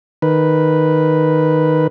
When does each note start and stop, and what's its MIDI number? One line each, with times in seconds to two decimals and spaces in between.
0.22 1.87 51
0.22 1.87 71